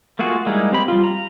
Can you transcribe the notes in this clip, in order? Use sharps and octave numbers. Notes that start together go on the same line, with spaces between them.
A3 A#3 F4 F#4 G#4
G3 G#3 A#3 D#4 E4
C4 G4 B5
G3 F4
A#5